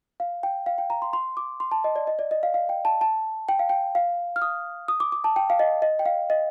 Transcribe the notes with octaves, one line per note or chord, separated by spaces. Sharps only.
F5
G5
F5
G5
A#5
C6
C6
D6
C6
A5
D#5
D5
D#5
D5
D#5
F5
F5
G5
A5
A5
G5
F5
G5
F5
F6
D#6
D#6
D6
D6
A5
G5
F5
D#5
D#5
G5
F5
D#5